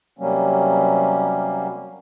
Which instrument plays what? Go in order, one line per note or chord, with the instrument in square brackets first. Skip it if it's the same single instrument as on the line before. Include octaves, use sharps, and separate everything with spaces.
[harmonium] C3 F#3 G3 A#3 C#4